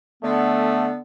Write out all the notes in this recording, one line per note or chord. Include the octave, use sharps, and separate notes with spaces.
D3 A3 B3